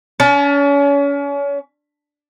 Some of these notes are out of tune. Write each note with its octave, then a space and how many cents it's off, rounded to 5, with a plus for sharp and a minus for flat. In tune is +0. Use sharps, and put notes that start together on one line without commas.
C#4 +35 A5 +0